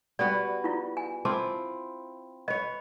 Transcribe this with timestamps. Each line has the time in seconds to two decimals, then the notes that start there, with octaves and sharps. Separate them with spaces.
0.19 G3 B3 F#4 D5
0.64 E4 F4
0.97 G#5
1.25 C4 E4 F4 A5 D6
2.48 B4 C#5 D#5